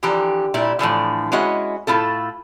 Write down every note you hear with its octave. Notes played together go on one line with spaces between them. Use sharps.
D3 E3 F3 G4 A#5
A#2 G3 E4
A2 D3 E3 F3
G#3 C#4 E4 F#4 D#5
A2 E4 F4 A4